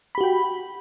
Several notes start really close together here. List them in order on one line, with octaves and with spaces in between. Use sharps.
B5 G4 F#4 G5